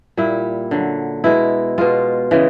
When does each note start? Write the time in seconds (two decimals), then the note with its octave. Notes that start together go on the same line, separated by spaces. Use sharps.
0.17 A#2 G3 E4
0.71 D3 F#3
1.24 B2 G#3 E4
1.78 B2 G#3 F4
2.31 C#3 E3 G#3